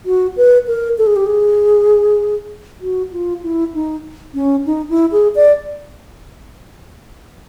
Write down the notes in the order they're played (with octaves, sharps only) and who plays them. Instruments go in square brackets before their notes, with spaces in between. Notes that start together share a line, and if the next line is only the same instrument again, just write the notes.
[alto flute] F#4
B4
A#4
A4
G#4
G4
G#4
F#4
F4
E4
D#4
C#4
D#4
E4
G#4
D5